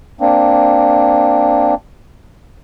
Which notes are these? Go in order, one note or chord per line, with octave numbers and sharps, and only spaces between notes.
A#3 C4 D4